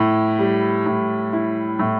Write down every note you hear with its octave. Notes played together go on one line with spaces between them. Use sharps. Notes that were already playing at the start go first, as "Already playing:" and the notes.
Already playing: A2 E4
G3
A2
E4
A2